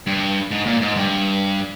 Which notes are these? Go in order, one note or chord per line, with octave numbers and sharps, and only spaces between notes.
G2
G#2
A#2
G#2
G2